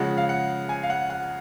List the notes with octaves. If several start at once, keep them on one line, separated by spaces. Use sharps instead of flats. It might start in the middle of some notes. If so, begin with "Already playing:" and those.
Already playing: C#3 F3 G#3 F#5
F5
F#5
G#5
F5
F#5
F#5